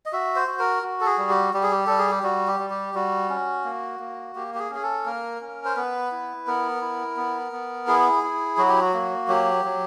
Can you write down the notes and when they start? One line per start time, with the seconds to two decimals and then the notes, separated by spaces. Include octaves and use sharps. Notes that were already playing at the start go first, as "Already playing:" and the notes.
0.06 D#5
0.13 F#4 E5
0.36 C5
0.48 F#4
0.59 A#4
0.83 F#4
1.01 A4
1.06 G#4
1.18 G3
1.30 G4
1.54 G3 G4
1.63 G#4
1.72 G4
1.87 G3 A4
1.99 G#4
2.11 G4
2.23 G3 F#4
2.47 G4
2.59 G3
2.70 G4
2.95 G3 F#4
3.30 C#4
3.64 A#3
4.00 A#3
4.35 A#3 G4
4.55 G4
4.59 G#4
4.70 C#4 G#4
4.83 A4
5.06 A#3 A#4
5.41 C#4
5.65 C5
5.76 B3 B4
6.12 E4
6.47 B3 A#4
6.81 E4
7.17 B3
7.52 B3
7.87 E4 G#4
8.23 E4
8.58 F#3 F#4
8.69 G4
8.81 F#4
8.94 A#3
9.28 F#3 G4
9.64 F#3